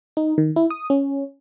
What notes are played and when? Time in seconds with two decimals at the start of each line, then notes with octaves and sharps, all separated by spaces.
0.17 D#4
0.38 D#3
0.56 E4
0.70 D#6
0.90 C#4